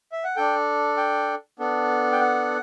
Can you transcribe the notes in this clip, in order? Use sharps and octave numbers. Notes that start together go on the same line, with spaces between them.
E5
F#5
D4 A4 G5
G5
B3 D4 A4
G5
F#5